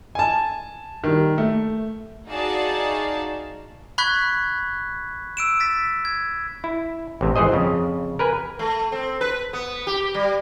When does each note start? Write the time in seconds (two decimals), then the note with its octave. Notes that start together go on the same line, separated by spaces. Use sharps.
0.15 G#5 A5
1.04 D#3 G3
1.38 A3
2.28 D#4 F#4 G#4 D5 F5 A5
3.98 B5 C#6 F#6 G#6 B6
5.37 E6 D7 E7
5.60 A6 B6
6.05 G#6
6.64 E4
7.21 A1 C3
7.36 G#1 E3 G#4 C5 D#5
7.52 F2 C#3
8.19 A#4 B4 G#5
8.59 A3
8.92 C4
9.21 B4
9.53 B3
9.87 G4
10.14 G3